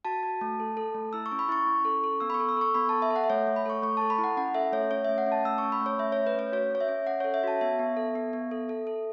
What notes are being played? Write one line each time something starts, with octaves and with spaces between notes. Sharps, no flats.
F#4 A5
F#4
A3
A4
A4
A3
E4 E6
C#6
C#4
B5
E4 C#6
C#4
A4
A4
B3 E6
B5
C#6
A4
E6
A4 C#6
B3 B5
A4 A5
E5
A4
F#5
E5
A3 C#5
A3
B5
A4 C#6
A3 C#6
A4 A5
B5
E4
F#5
C#4 F#5
A4 E5
A3 C#5
C#4 C#5
A3 E5
F#5
C#4
A5
A3 E6
C#4 C#6
B5
A3
C#5
A3 E5
C#4 C#5
B4
A3 C#5
F#4 C#5
C#4 C#5
E5
C#4
C#4 F#5
A4 C#5
E5
F#4 A5
B3 E5
B3
A4
B3
B3
A4
A4
A4